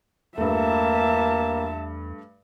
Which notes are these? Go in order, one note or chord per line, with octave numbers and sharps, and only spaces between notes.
E2 G2 A3 A#3 E5 A5